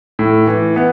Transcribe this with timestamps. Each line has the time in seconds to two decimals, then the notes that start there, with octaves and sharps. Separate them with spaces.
0.19 A2
0.47 E3
0.76 B3